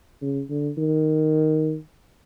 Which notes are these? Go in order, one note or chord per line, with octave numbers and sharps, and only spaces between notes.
C#3
D3
D#3